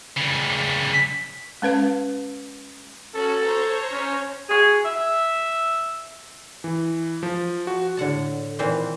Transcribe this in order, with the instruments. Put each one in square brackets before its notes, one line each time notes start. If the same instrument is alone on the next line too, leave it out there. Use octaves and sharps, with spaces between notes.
[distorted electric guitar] C#3 G3
[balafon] G#3 C#4 B4 F5
[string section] C#4 F#4 [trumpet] A4
[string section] C5 C#5 A#5
[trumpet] C#4
[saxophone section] F#4 G#4
E5
[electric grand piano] E3
F3
F#4
[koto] A2 D3 F#5 A5
A#2 D#3 E3 C4 B4 C5